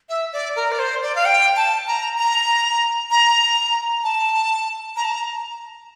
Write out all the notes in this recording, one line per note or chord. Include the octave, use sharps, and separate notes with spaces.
E5
D5
A#4
D5
C5
D5
F5
G5
A5
A#5
A#5
A#5
A5
A#5
A5
A#5